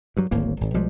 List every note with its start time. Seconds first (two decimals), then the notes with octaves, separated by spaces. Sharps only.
0.17 G2 F#3
0.31 D1 G#1 A2 A#3
0.61 G#1
0.74 B1 F3 G3 G#3